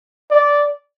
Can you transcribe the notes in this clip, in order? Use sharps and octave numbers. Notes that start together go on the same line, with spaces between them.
D5